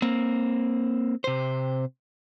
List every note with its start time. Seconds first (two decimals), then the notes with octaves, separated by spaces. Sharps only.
0.02 A#3 C4
1.24 C3 C5